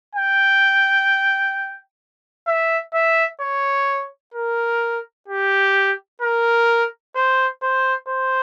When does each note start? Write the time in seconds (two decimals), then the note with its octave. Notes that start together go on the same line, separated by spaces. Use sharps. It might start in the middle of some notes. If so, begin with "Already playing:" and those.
0.15 G5
2.47 E5
2.94 E5
3.41 C#5
4.34 A#4
5.28 G4
6.21 A#4
7.15 C5
7.62 C5
8.08 C5